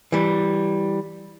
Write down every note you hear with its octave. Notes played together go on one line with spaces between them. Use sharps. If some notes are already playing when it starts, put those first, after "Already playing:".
E3 G3